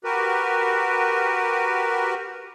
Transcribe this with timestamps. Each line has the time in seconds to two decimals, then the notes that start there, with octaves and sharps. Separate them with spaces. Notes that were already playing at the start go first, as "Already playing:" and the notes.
0.04 F#4 G4 A#4 B4